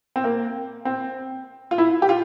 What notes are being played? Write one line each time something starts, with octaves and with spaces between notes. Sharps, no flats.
C4
A#3
C4
F4
E4
G4
F4